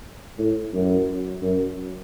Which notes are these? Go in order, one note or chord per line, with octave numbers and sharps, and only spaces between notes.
A2
F#2
F#2